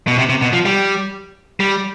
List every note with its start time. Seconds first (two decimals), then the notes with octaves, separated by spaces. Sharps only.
0.08 B2
0.18 C3
0.29 C3
0.42 B2
0.53 F3
0.65 G3
1.60 G3